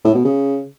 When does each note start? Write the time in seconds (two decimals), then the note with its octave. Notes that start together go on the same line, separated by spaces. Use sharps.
0.05 A2
0.15 B2
0.25 C#3